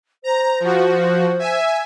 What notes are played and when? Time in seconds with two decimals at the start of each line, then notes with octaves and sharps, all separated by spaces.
0.24 C5 A#5
0.60 F3 F#4
1.39 E5 G#5